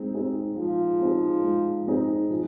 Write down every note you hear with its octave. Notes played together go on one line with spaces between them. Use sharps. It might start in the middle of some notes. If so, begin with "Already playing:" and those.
Already playing: G#3 C4 D#4
C4 D#4 G#4
F3 G#3
C4 D#4 G#4
G#3
C4 D#4 G#4
F3